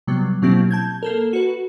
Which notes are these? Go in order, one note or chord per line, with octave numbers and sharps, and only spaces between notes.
C3 F#3 G3 B3
B2 F#3 A#3 C4 E4 G4
A5 G6 G#6
A#3 A4 A#4
F#4 B4